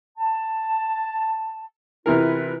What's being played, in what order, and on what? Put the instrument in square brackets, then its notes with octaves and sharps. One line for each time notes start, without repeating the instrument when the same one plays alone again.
[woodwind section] A5
[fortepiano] C3 E3 A#4 [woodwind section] E4 F4 B4